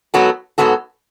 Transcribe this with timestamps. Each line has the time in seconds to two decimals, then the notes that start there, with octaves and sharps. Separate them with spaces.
0.14 G#2 F#3 B3 F#4 A4
0.58 G#2 F#3 B3 F#4 A4